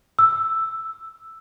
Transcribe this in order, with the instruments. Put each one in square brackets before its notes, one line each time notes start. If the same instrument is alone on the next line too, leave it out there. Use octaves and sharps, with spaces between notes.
[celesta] E6